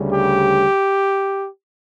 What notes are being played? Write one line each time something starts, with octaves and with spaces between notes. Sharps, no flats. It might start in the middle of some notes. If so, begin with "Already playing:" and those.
Already playing: D2 C#3 G3
G4